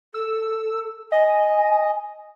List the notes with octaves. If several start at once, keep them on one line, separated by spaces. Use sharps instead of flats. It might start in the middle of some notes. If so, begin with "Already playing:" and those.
A4 E6
D#5 G#5